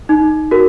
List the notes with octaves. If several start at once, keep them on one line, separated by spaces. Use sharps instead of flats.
D#4
F#4 A#4